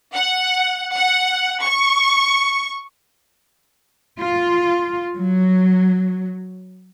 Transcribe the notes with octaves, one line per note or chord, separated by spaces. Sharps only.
F#5
F#5
C#6
F4
F#3